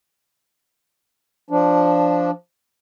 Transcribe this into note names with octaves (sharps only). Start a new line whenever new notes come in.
F3 D4